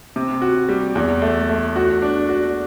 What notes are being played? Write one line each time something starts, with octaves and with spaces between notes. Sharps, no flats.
C3
F#4
G3
E2
A3
A3
F#4
D4
F#4